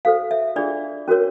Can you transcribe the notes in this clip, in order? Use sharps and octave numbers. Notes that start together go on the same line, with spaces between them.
F#4 A4 C5 F5
E5
D4 F4 G#4 D5
C#4 F#4 A#4 C#5